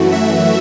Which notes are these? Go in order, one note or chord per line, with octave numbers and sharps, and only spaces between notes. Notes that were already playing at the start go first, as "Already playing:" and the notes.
Already playing: F#2 E3 A3 F#4
E5